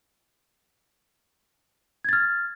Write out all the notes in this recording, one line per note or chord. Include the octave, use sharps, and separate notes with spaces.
F6 G#6 A6